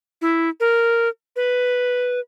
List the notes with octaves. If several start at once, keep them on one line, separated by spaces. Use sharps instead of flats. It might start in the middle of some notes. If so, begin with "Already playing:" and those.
E4
A#4
B4